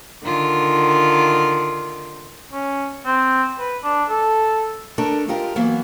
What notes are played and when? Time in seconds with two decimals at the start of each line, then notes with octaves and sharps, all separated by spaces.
0.23 D3 D#3 F4
2.53 C#4
3.06 C4
3.59 B4
3.84 D4
4.09 A4
4.98 A3 D4 A4 A#4
5.28 G#3 F4 G4 A#4
5.56 E3 F#3 A#3 B3